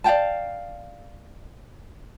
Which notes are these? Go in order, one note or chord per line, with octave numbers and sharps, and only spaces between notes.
D5 F5 G5 A5